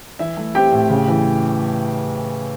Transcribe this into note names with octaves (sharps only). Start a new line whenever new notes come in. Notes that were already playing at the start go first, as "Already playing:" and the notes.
E3 E4 E5
A3
C4 G4 G5
A2
C#3
E3